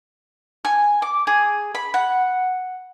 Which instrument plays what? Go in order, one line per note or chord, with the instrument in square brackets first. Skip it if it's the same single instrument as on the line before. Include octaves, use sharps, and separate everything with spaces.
[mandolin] G#5
D6
G#4
B5
F#5